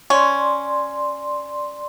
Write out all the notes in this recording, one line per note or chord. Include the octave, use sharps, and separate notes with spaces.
C#4 D5 C6